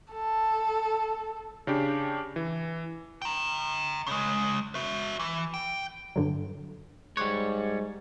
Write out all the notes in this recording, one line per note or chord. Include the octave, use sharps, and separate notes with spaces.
A4
C#3 D4 G4
E3
G5 A#5
C#3 G#3
F#4 E5
E3
G5
G2 D3 F#3
G#2 G3 C#5 C6 D6 F#6